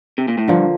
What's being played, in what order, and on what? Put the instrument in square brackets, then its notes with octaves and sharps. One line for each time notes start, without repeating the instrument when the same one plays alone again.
[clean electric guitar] C3
A#2
A2
[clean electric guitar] G2 [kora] D3 F3 A#3